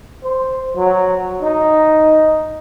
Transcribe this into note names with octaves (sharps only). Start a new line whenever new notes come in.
C5
F#3
D#4